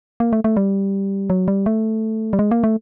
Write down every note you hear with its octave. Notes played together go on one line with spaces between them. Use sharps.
A#3
A3
A3
G3
F#3
G3
A3
G3
G#3
A#3
A3